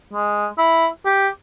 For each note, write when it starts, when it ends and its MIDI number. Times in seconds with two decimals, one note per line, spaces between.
0.13 0.47 56
0.58 0.87 64
1.05 1.28 67